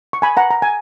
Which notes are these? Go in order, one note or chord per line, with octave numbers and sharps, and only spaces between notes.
C#6
G#5 B5
F#5 A#5
A#5
G#5